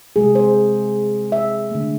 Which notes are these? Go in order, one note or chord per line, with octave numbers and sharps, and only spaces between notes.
C3 G#3 G#4
C5
E5
D3 A3